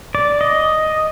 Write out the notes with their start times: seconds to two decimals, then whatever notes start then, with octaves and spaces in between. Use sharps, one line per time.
0.15 D5
0.41 D#5